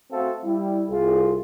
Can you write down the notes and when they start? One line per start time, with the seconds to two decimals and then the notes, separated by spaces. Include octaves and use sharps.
0.12 A3 C4 F#4 A4 E5 F5
0.44 G3 E4
0.90 C2 F4 G#4